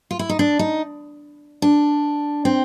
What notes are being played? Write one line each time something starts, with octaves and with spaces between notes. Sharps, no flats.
F4
E4
D#4
D4
D#4
D4
C4